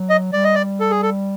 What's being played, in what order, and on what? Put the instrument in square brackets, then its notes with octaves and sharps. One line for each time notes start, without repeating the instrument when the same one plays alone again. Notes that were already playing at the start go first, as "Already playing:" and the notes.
Already playing: [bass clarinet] F#3
[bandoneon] D#5
[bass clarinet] G3 [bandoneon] D5
[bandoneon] D#5
D5
A4
G#4
A4